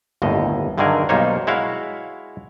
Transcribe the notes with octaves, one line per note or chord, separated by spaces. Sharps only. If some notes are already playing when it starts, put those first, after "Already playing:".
G1 D#2 A2 D#5
G2 D3 D#3 F#3 G#4 A#4
B1 G3 A#3 D#4 C5 C#5
G#3 E4 F#4 C#5 F5